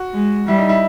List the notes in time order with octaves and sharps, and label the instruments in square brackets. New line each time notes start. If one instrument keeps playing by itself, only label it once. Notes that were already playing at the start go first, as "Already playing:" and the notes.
Already playing: [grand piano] F#4
[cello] G#3
[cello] G3 [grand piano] E4
[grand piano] D#4
E4